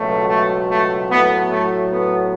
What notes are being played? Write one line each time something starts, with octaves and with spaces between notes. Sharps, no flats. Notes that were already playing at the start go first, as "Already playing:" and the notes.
Already playing: C#2 B2 F#3 A3
A3
A3
A2 F#3 A3 B3
A3
B3